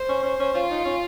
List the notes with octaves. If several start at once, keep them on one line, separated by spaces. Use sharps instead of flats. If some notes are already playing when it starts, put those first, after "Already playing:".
Already playing: C5
C#4
C#4
C#4
C#4 F4
D#4
C#4